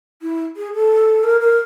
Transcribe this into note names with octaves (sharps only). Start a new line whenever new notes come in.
E4
G#4
A4
A#4
A#4